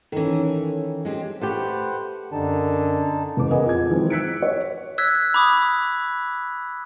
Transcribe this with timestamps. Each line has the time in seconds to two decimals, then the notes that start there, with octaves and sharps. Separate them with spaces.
0.12 D#3 E3 C#4 A4
1.05 G#3 C4 G4
1.41 A3 G4 B4 C5 F#5
2.32 F#2 D3 D#4 A5
3.37 F#1 E2 D6
3.51 G#4 A#4 B4 D#5 F#5 G#5
3.66 F2 G#6
3.90 D#3 E3 F#3 G#3 C4 E4
4.10 E6 F#6 G#6 B6 C#7 D7
4.42 C#5
4.98 E6 F#6 G#6 B6
5.34 B5 D6 D#6